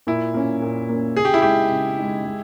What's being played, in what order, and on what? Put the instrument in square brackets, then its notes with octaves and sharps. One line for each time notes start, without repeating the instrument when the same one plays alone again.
[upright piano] A#2 [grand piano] E4
[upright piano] A#3 C#4
A#2
A#3 C#4
[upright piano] C#3 [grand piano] G#4
[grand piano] G4
E4
[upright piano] G#3 D#4 [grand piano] G4
[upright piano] C#3
G#3 D#4
G#3